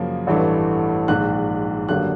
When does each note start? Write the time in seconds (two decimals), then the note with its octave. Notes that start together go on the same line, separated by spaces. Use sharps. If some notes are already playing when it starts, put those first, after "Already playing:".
Already playing: F#2 C#3 F3 A#3
0.27 A1 G2 E3 A3
1.08 A#1 G#2 D#3 F#6
1.89 G#1 F#2 D3 G3 A#3 F#6